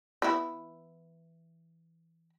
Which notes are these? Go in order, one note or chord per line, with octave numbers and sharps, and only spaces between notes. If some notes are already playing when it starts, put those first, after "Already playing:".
E3 B3 E4